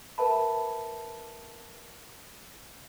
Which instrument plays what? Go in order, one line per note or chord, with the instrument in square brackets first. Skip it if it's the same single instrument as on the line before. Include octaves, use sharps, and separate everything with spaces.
[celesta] A#4 B4 E5 A5 B5